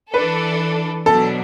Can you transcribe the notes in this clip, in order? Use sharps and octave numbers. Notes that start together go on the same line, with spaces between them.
E3 D4 A4 B4
B2 F#3 D4 A4